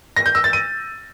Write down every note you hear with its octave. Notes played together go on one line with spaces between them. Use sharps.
A#6
G6
E6
A6
D#7